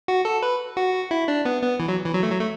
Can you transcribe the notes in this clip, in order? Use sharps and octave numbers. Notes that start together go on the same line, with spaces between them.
F#4
A4
B4
F#4
E4
D4
B3
B3
E3
F#3
E3
F#3
A3
F#3
A3